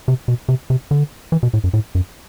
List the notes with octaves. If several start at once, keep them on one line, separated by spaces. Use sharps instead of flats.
C3
B2
C3
C3
D3
E3
B2
A2
F#2
A2
F#2